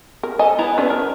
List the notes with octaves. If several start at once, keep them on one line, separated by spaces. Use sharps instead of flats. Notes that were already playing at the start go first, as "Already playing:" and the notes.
A#4
A4 D#5 G#5
B3 E4 A#5
C#4 D4 B4
A#4